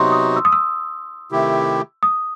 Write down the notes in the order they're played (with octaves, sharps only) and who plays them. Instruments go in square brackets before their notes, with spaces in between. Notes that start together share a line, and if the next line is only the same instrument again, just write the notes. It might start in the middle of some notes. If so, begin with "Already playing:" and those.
Already playing: [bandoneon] C3 F#3 B3 D#4 F#4 [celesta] C6
[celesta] D#6
E6
D#6
E6
[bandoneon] C3 D#3 A3 E4 G4
[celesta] D#6